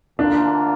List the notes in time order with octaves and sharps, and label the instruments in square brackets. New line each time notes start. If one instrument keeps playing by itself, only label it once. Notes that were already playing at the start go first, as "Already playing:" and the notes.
[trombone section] D2 D3 A#3 F4 [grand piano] D4